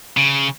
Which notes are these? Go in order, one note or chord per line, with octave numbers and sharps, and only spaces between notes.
C#3